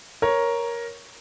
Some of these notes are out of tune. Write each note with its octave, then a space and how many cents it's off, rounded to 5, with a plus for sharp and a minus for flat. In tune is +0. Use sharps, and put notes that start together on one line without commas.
A#4 +10 C#5 +0